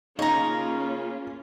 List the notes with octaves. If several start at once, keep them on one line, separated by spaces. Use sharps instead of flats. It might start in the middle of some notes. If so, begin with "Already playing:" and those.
C#3 A#3 C#4 D#4 F4 C#5 A#5